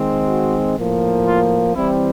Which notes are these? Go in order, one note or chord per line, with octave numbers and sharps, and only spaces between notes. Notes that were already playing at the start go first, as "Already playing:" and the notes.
Already playing: D#3 G#3 C4
F#4
A2 F3 A#3
F4
E3 G3 C4 E4